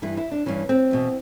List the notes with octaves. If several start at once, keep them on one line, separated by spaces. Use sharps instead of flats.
G2 E3 E4
E4
D4
G2 E3 C#4
C4
E2 B2